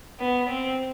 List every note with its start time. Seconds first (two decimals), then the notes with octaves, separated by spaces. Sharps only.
0.20 B3
0.49 C4